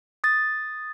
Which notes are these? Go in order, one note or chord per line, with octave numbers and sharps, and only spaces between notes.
D#6 A6